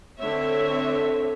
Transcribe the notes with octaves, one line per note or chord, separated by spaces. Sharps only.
D3 C4 C#5 E5